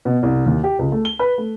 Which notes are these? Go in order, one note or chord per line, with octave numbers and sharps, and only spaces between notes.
B2
C2
D#2
G4
C#2
A3
G7
B4
A3